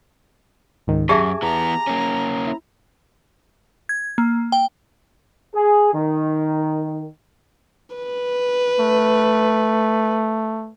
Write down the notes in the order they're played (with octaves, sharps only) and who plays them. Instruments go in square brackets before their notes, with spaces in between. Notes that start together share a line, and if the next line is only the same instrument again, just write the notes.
[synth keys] C#2 G#2 D#3
[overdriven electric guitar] F#2 [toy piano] G4 G#4 E5 [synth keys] G#5 A5 D6
[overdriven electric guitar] E3 B3 [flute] A#5
[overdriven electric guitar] A#3 C#4
[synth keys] E4
[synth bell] G#6
A#3
G5
[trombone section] G#4
D#3
[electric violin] B4
[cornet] A3